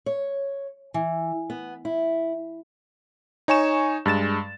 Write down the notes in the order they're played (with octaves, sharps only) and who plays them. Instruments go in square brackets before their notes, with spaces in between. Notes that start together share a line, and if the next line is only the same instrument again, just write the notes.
[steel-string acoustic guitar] C#5
E3
B3
E4
[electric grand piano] D#4 C#5 G#5 C#6 E7
G2 G#3 A6 E7